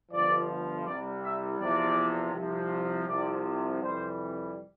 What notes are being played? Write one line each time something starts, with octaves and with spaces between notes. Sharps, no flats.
G1 G2 F3 D5
C2 C3 G3 D5
E5
E2 C3 F3 D5
C2 C3 F3
C2 C3 F3 D5
F2 C3 E3 G3 C5